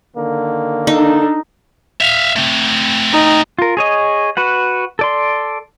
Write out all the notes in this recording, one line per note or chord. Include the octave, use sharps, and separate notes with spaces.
D3 D#3 A#3
D4 D#4 A4
E5 F5
A3 C4
D#4
F4 A#4
G#4 C#5 D#5
F#4 B4 F#5
A4 D5 C6